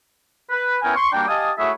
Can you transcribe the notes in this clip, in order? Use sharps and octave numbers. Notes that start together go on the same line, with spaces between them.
B4
B3 C#4 E4 A#4 G5 G#5
C6 C#6
G3 A#3 D4 F#4 G5
G4 D#5 F5 G#5 A5 D#6
A3 E4 F#4 G#4 C#5 E5